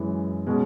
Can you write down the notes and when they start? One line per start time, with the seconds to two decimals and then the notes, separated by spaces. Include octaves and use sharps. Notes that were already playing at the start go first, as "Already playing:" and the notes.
Already playing: F#2 E3 G#3
0.47 B2 G#3 C#4 G#4